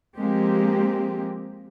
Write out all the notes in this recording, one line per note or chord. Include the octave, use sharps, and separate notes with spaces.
F3 G#3 A#3 C4 G4